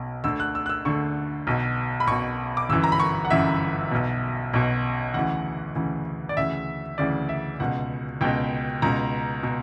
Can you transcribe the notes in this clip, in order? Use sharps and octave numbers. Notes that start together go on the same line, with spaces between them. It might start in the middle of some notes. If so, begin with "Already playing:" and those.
Already playing: B1 B2
D2 D3 E6
F#6
E6
F#6
E6
D2 D3 C#6
B1 B2
B5
B1 B2 C#6
D6
G1 F#2 E3 E6
A#5
B5
C#6
F#5
G1 F#2 E3 E5
B1 B2
B1 B2
D2 C#3 E3 F#5
D2 C#3 E3
D5
D2 C#3 E3 E5
D2 C#3 E3 D5
E5
C#2 B2 F#5
C#2 B2 G5
C#2 B2 A#5
B2